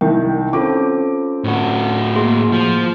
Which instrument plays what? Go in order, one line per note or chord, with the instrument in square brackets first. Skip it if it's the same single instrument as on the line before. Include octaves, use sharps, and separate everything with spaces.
[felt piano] C2 D#3 [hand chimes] G5
[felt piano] C4 D6 [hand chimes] C#4 F4 A4
[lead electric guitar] A2 F#4
[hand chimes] A#3 G#4 C6
[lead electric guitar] F3